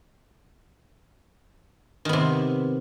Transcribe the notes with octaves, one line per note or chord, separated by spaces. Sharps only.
C3 D#3 B3